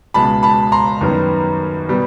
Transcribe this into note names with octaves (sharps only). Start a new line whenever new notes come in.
C#2 B2 G#3 A5 B5
A5 B5
A#5 C6
F#2 D#3 G3 B3
B2 G3 B3